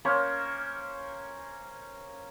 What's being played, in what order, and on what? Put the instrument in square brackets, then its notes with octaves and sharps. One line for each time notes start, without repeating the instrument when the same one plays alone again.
[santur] A#3 C#4 A#4 C5